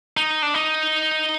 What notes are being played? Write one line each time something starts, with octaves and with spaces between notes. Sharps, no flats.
D#4
D4
D#4